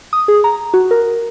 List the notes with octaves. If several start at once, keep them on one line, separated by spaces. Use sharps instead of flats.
D#6
G#4
A#5
F#4
A#4